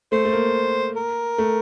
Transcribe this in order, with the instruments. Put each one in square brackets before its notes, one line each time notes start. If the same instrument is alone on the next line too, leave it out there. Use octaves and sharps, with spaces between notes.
[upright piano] A3 [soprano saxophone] C5
[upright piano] A3
A#3
[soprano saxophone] A#4
[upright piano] A3